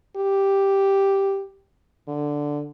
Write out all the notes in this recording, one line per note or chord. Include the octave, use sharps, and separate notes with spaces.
G4
D3